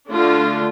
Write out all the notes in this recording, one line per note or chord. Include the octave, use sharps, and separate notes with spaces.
D3 A3 D4 F4